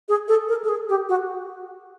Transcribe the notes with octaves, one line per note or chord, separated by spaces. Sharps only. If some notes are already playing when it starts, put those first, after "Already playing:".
G#4
A4
A#4
A4
G#4
G4
F#4